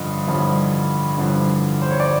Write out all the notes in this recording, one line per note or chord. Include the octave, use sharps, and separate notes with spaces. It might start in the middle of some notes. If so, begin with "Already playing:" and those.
Already playing: A1 G2 D3 F3 D#5
A1 G2 D3 F3
A1 G2 D3 F3
C5
C#5
D5